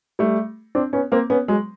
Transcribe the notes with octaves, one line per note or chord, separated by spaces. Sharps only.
G3 A3
C4 D4
B3 C#4
A#3 C4
B3 C#4
F#3 G#3